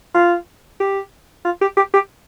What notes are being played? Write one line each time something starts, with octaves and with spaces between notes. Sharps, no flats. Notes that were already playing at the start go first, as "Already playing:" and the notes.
F4
G4
F4
G4
G4
G4